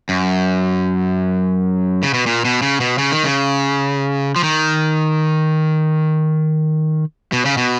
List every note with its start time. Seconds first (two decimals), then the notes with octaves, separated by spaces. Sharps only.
0.09 F#2
2.03 C#3
2.14 B2
2.26 A#2
2.45 B2
2.62 C#3
2.80 B2
2.98 C#3
3.12 D#3
3.25 C#3
4.36 F3
4.44 D#3
7.32 B2
7.45 C#3
7.57 B2